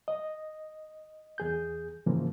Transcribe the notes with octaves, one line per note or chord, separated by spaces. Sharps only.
D#5
E2 G#4 G6
G#2 C#3 E3 F3 G#3 A#3